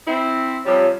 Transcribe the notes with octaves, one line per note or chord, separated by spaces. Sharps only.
C4 E4
C3 F3 G3 C#5